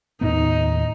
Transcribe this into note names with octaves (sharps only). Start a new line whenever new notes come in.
D#2 A2 B3 D#4